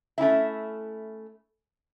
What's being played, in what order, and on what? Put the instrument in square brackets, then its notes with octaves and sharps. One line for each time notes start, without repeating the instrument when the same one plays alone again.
[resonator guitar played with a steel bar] A3 C#4 E4 E5